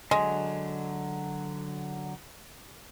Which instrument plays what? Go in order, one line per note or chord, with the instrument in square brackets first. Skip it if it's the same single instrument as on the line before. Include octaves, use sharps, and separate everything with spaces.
[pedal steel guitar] D3 F#3 [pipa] G#3